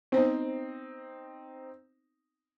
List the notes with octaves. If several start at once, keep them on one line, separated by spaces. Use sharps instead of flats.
B3 C4 D#4 C5